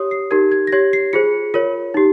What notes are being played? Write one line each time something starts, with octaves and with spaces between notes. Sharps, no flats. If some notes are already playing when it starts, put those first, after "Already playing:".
Already playing: G4 C#5 D#6
C7
D#4 G4 A#4 G#6
G#6
A#6
G4 C#5 G#6
C7
F4 G#4 C5 C#7
F4 A#4 C#5
D#4 G4